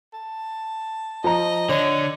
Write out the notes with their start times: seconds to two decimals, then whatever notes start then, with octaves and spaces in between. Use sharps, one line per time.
0.13 A5
1.24 F3 C5 D#5 A#5
1.69 D3 C#5 D5